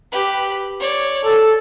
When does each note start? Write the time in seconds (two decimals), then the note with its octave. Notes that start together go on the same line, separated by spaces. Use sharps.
0.11 G4 B4
0.79 C#5 D5
1.25 A4